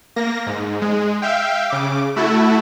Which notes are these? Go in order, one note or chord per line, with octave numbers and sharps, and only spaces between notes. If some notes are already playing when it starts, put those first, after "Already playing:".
A#3 A#6
G#2
G#3
E5 F5 G5
C#3 D6
A3 E4 F#4 A4